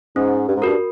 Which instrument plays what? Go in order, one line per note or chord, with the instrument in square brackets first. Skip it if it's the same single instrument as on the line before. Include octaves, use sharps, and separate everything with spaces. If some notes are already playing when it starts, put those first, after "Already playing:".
[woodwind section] G#2 [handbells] C#4
[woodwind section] G2
G#2
[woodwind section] G2 [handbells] F#4 A#4